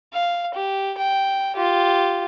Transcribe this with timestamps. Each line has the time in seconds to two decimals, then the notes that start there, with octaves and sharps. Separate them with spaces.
0.14 F5
0.55 G4
0.98 G5
1.56 F4 G4